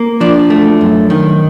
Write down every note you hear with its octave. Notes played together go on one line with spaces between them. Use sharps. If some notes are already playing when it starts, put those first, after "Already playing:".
Already playing: A#3
F3 D4
A3
F#2
D#3